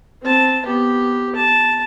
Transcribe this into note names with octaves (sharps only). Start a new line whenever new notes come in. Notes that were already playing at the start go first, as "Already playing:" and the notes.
C4 A5
B3 G4
A5